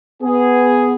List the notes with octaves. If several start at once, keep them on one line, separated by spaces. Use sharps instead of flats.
B3 G#4